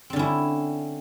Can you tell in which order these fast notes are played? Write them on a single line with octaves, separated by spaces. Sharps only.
C4 D3 C#4 E4